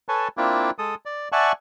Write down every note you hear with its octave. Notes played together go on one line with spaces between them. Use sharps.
A4 B4 C#5 G#5 A5
A#3 C4 D4 E4 F4
G#3 A4 D#6
D5
D5 E5 F#5 G#5 A5 C#6